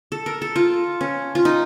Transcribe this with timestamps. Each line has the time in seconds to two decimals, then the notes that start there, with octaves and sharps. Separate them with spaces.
0.12 A4
0.26 A#4
0.42 A4
0.56 F4
1.01 C#4
1.35 F4
1.45 D#4